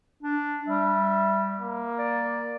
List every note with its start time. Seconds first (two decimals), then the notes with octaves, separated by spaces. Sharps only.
0.23 D4
0.68 G3 E5
1.60 A#3
1.99 D5